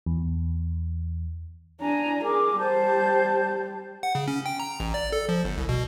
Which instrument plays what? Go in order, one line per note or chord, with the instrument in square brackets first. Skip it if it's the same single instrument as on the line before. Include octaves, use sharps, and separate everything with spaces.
[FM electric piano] E2
[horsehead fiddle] D4 A#5 [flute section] G#5
[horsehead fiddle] G#4 A#4 [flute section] D6
[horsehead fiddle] G3 G4 [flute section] C5 A5 G6
[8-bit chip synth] F#5
C#3
C#4
G5
A#5
A1
D5
A4
F3
G1
C2
B2